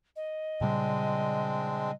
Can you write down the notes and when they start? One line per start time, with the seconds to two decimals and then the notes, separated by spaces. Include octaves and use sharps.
0.16 D#5
0.61 A#2 C#3 G3 G#3 C4 D4